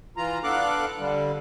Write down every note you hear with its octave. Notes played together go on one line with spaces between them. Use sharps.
E3 F4 A#5
B3 D4 A4 F5 D6 F#6
D3 G3